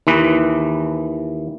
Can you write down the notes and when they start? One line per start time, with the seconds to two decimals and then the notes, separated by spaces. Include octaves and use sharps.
0.07 D#2 E3 B4